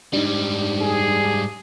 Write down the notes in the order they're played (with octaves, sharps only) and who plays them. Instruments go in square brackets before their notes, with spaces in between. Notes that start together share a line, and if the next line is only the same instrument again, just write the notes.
[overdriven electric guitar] G#2 G3 [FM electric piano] D4 D#4
[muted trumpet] G#4